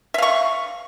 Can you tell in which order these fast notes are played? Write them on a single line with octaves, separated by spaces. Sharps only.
E5 F5 C#6